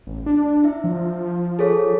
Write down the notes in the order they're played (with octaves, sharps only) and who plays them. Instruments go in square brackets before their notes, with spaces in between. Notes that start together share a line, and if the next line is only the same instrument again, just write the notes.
[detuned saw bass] A1
D4
[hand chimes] E4 E5
[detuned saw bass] F3
[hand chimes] G#4 A4 C#5